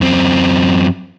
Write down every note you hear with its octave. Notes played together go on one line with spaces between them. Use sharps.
F#2 C4